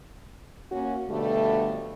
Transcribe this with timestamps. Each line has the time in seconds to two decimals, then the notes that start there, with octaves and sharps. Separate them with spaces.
0.72 A#3 C#4 F#4
1.09 B2 D3 F3 G3 A3